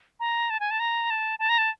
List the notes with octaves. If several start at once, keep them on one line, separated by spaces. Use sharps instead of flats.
A#5
A5
G#5
A5
A#5
A5
A5
A#5
A5